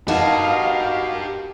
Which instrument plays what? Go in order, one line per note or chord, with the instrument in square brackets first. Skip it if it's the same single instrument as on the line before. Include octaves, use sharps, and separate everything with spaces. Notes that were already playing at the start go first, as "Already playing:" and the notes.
[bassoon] B2 [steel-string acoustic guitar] D#4 F#4 A#4 [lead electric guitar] G4 A5 [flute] F5